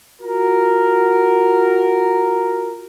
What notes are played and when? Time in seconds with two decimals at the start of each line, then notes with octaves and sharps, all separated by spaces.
0.22 F4 F#4 A#4